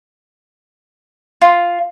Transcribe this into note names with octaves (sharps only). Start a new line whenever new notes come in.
F4